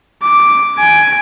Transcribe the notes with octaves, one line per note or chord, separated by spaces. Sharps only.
D6
G#5 D7